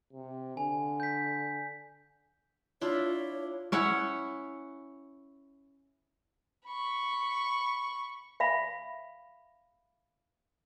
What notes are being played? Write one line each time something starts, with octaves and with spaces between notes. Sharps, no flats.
C3
D3 G#5
G6 B6
D4 E4 F4 C#5
C#4 E4 C#5 F#5
B5 C#6
E5 F5 B5